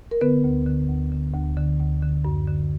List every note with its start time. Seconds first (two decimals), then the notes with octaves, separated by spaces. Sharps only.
0.11 A#4
0.21 D3 B3 B4
0.44 D2
0.66 D3
0.89 D2
1.12 D3
1.34 D2
1.57 D3
1.79 D2
2.02 D3
2.25 F#2
2.47 D3